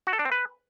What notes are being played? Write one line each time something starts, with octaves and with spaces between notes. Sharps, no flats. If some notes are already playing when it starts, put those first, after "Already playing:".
F#4
A4
D4
C4
B4